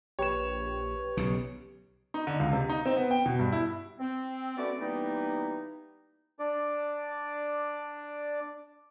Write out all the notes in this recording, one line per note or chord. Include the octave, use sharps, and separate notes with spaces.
A#1 G4 B4 C#5 E7
B1 C#3
D#4
D3
C#2
C3
D#4
C4
B3
G5
B2
G2
E4
C4
A3 B3 C#4 F#4 D5
E3 G3 A#3 B3 D#4
D4 D5